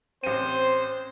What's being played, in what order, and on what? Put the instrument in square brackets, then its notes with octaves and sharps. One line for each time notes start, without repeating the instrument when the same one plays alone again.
[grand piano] A1 D#7 [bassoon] C4 [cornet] C5